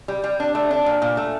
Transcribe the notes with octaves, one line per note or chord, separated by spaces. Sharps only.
G3
G3
D4
A3
D4
A#2
A#2
A3